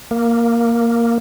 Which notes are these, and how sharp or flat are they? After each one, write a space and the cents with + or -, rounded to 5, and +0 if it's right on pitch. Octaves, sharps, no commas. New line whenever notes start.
A#3 +0